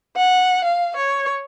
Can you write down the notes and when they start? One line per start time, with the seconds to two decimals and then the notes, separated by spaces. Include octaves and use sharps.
0.16 F#5
0.64 F5
0.96 C#5